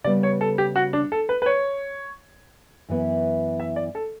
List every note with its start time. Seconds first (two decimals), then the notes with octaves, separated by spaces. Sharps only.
0.04 C#3 G3 B3 D5
0.23 C#5
0.41 A4
0.58 G4
0.76 F#4
0.93 D4
1.12 A4
1.29 B4
1.42 B4
1.46 C#5
2.88 F#2 E3 B3 E4
3.60 E5
3.76 D5
3.95 A4